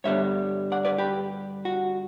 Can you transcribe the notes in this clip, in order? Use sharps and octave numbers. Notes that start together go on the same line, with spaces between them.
G2 D3 G3 B3 C#5 E5
D5 F#5
B4 D5
G4 B4
F#4